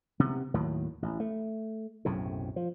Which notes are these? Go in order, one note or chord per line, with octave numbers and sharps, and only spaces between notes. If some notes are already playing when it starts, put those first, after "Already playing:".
C3 B3
D#2 A2 D#3 F#3
A1
A3
B1 F#2 A2 C3
F3